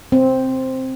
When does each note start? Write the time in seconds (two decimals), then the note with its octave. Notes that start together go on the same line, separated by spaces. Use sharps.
0.12 C4